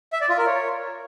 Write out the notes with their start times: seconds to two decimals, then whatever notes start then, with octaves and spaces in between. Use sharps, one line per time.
0.13 E5
0.21 D5
0.29 F4
0.38 A#4
0.46 C#5